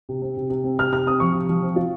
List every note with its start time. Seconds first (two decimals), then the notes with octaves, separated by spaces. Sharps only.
0.09 C3
0.22 C4
0.37 C3
0.50 C3
0.64 C4
0.78 C3 F6
0.92 C3 F6
1.06 C4 D#6
1.20 F3 C#6
1.35 C3
1.49 F3
1.63 C4
1.76 F4